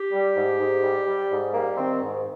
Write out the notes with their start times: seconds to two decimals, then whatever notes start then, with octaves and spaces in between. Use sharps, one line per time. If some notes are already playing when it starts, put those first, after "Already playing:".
Already playing: G4
0.12 G3
0.36 G#2
0.59 G#2
0.83 G3
1.07 G3
1.31 G#2
1.54 G3 A#3
1.77 D#3 C4
2.02 G#2